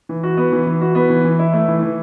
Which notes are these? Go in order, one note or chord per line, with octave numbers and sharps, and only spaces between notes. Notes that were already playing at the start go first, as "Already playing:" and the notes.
E3
F#4
B3
E3
E3
F#4
B3
E3
E3
E4
A3
E3
E3